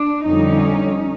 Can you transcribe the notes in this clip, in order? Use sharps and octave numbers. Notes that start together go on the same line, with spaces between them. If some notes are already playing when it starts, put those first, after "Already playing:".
Already playing: D4
F2 D3 G3 C#4 D#4